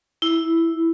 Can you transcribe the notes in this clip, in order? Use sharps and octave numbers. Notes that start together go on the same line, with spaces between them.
E4